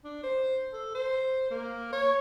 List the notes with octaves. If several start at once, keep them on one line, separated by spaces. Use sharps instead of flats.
D4
C5
A4
C5
A#3
C#5